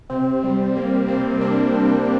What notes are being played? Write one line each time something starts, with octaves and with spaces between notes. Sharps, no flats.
C3 C4
G3
G3 A#3
C3 C4
C3 D4
G3